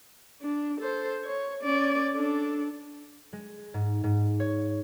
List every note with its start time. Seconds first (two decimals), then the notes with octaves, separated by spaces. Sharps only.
0.42 D4
0.80 A4 C5
1.24 C#5
1.63 C#4 D5
2.14 D4 A4
3.33 G#3
3.74 G#2
4.04 G#2
4.40 C#5